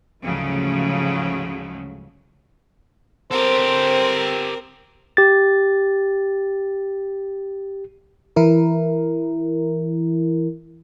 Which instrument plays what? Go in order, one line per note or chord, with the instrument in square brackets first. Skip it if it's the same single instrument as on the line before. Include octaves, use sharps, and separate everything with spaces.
[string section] D2 G#2 C#3 F3 F#3 A3
[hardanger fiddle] C4 A#4 [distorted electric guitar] G4 A4 [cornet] C5
[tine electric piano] G4 A6
[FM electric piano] E3 E4 A#4